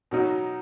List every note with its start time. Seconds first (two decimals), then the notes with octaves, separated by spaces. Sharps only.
0.11 B2 F#3 D#4 F#4